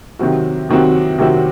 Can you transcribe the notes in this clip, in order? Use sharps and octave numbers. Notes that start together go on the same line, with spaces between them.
C3 D#3 F#3 C4 F#4
C3 D#3 F#3 C4 F#4
C3 D#3 F#3 C4 F#4